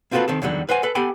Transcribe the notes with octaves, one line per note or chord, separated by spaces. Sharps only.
A#3 C4 F4 F#4 A4 B4
D#3 C4 A4
E2 D3 D#3 F#3 G3
B4 C5 F#5 G#5
A4 B4
B3 G4 A4 G5 G#5 B5